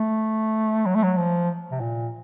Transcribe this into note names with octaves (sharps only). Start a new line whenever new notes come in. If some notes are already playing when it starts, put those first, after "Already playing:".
Already playing: A3
F#3
A3
F#3
F3
C3
A#2